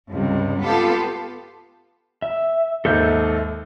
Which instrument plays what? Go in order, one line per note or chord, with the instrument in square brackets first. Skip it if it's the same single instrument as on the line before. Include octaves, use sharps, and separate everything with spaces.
[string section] C#2 G2 C3
B3 F4 G4 A4
[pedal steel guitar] E5
[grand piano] D#2 G#2 [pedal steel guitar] A4 E5 G6